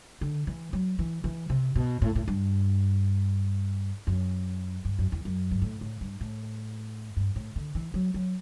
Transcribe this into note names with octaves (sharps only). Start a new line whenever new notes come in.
D3
E3
F#3
E3
E3
C3
B2
A2
A2
G2
F#2
G2
F#2
E2
F#2
G2
A2
A2
G2
A2
G2
A2
D3
E3
F#3
F#3